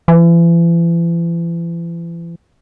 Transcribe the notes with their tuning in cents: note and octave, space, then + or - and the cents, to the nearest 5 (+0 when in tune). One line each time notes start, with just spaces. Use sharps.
E3 +40